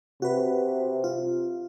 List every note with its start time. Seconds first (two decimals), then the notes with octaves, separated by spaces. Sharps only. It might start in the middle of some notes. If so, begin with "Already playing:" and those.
0.22 C3 F#4 B4
1.04 F4